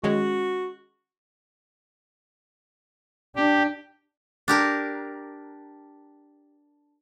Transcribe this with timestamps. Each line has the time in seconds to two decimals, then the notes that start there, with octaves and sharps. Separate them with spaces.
0.03 D#3 G#3 C#4 F#4
3.36 D4 G4
4.48 D4 G4 A#4